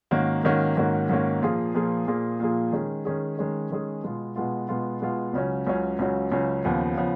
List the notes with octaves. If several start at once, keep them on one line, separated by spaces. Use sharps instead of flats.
G#2 D#3 A#3 C#4 F#4
G#2 D#3 A#3 C#4 F#4
G#2 D#3 A#3 C#4 F#4
G#2 D#3 A#3 C#4 F#4
A#2 F3 A#3 F4 G#4
A#2 F3 A#3 F4 G#4
A#2 F3 A#3 F4 G#4
A#2 F3 A#3 F4 G#4
D#3 G#3 C#4 G#4
D#3 G#3 C#4 G#4
D#3 G#3 C#4 G#4
D#3 G#3 C#4 G#4
B2 G#3 B3 F4
B2 G#3 B3 F4
B2 G#3 B3 F4
B2 G#3 B3 F4
C#2 C#3 F#3 C#4
C#2 C#3 F#3 C#4
C#2 C#3 F#3 C#4
C#2 C#3 F#3 C#4
D#2 C#3 F3 B3
C#3 F3 B3